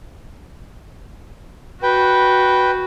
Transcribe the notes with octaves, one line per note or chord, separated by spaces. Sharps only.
F#4 B4 G5